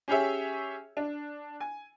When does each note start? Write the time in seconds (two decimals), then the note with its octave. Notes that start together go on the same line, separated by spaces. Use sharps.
0.08 C#4 G4 G#4 C#5 E5
0.97 D4
1.60 G#5